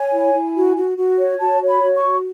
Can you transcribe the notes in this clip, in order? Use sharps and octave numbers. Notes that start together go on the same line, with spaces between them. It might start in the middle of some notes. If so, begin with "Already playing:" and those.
Already playing: C#5 G#5
E4
E4
F#4
F#4
F#4
C#5
F#4 A5
C#5
B5
F#4
C#6
F#4